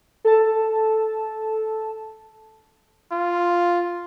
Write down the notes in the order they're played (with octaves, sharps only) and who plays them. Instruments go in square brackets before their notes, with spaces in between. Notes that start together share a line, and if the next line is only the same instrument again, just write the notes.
[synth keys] A4 A5
[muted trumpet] F4